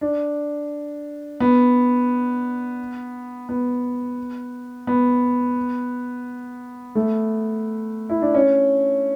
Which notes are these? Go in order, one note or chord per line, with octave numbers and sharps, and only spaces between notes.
D4
B3
B3
B3
A3
E4
D4
C#4